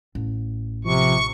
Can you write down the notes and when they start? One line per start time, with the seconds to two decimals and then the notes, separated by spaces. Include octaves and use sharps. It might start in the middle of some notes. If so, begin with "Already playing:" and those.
0.15 A1
0.85 C3 F3 C#6